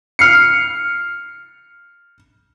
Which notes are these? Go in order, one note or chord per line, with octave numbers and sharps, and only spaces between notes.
F6 C7 C#7